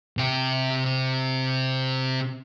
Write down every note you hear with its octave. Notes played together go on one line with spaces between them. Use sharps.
C3 G5